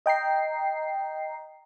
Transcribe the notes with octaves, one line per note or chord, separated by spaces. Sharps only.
D#5 G5 A#5 C7